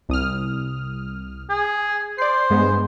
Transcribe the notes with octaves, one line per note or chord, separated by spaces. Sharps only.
C2 D#6 F6
G#4
C5 D5 C7
G2 G#3 B3